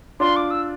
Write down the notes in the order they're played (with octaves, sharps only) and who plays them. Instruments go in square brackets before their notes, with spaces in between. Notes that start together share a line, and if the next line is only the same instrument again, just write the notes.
[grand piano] D4 F4 [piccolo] C6
[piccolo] D6
E6